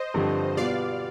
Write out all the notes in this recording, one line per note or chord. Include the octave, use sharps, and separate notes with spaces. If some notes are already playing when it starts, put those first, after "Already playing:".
Already playing: C5 D#5
G2 D3 F3 C4 G4
B2 G3 B3 F4 D5 F5